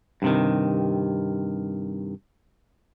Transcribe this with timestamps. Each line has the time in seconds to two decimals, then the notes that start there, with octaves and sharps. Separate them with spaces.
0.22 G2 C3 D#3